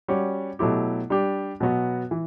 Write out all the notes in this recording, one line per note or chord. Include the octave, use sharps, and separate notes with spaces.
G3 C#4 F#4
B2 F#3 A3 E4 G4
G3 D4 G4
B2 F#3 B3 F#4
E3